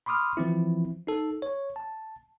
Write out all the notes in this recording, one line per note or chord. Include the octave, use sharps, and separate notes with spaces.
B5 C6 D6 D#6 F6
E3 F3 C4 E4
D#4 A4
C#5
A5